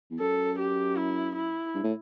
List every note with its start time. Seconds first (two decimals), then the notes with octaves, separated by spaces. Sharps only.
0.10 E2
0.20 F#2 A4
0.59 G4
0.97 E4
1.36 E4
1.74 G2
1.83 A2